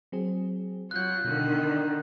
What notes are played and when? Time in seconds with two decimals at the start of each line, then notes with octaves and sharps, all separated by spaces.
0.12 F#3 C4 G#4
0.91 F#3 F4 F#6 G6
1.25 B2 D3 D#3
1.69 D5 A#5